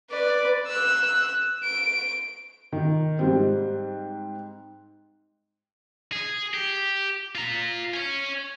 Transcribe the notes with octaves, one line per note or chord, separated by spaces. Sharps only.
B4 D5
E6 F#6
D7
D#3
G#2 G3 C4
G#4
G4
F4 A#5
C#5 G#5